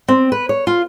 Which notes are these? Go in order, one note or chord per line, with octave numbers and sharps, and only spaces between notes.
C4
B4
C#5
F4